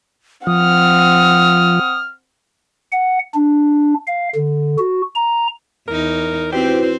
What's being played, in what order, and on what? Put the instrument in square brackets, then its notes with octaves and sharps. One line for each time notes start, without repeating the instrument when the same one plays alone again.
[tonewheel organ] F3 [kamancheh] C4 F#5 [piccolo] D#6 [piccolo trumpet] F6
[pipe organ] F#5
D4
F5
D3
F#4
A#5
[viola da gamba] E2 D#4 [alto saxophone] A#4
[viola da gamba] C4 C5 [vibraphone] E4 F#4 B4 [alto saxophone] G4